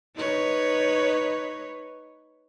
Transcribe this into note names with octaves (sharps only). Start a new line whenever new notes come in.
D#4 B4 C#5